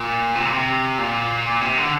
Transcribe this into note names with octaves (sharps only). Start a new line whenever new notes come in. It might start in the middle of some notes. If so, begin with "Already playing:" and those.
Already playing: A#2
C3
A#2
C3
A#2
C3
D3